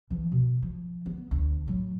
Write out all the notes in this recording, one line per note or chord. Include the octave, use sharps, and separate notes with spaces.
E3 F3
B2
F3
B3
D2
A2 F#3